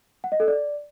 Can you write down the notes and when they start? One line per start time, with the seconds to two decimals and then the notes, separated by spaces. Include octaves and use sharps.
0.24 F#5
0.32 D#5
0.40 A4
0.48 D5